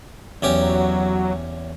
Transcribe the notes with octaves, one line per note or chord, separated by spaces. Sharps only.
E2 F#3 C#4 G4